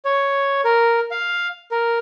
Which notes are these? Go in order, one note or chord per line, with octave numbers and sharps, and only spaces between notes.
C#5
A#4
F5
A#4